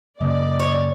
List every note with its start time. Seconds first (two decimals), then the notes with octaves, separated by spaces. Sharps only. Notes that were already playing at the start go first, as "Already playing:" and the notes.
0.20 F#2 C#3 A#3 D5 D#5
0.60 C#5